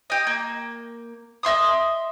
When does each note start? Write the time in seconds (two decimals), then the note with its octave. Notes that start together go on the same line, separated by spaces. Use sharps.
0.10 G4 D#5
0.27 A#3
1.43 D#5 E5 C6 D#6